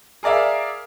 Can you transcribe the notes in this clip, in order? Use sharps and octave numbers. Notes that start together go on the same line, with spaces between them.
G#4 A#4 D5 E5 F5